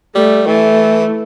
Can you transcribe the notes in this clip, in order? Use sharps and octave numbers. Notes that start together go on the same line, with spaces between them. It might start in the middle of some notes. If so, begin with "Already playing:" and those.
G3 A3
E3 A3